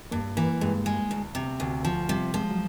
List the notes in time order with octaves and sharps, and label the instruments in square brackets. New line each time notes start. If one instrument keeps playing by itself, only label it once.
[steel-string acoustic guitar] G2 [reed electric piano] A#3
[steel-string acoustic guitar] E3 [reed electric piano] A#3
[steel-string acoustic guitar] G2 [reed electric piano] G#3
[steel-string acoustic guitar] G#3
D2
C3
D2
F3
[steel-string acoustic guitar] C3 [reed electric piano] G3
[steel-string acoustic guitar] F3 [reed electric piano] G#3
[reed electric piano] F#3